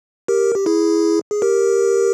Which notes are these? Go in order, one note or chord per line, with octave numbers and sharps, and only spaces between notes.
G4 A#4
G4
E4 G#4
G#4
G4 A#4